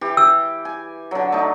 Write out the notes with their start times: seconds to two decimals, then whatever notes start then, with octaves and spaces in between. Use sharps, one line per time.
0.01 E3 G4
0.17 E6
0.65 G#5
1.11 D3 F#3
1.32 A3 D#4